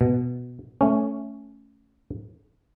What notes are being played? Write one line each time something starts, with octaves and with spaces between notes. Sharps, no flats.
B2
A3 C#4